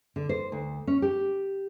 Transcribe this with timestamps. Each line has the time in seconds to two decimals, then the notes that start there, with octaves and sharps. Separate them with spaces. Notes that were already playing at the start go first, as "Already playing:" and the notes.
0.16 D3
0.29 C5
0.52 D2
0.87 C#4
1.02 G4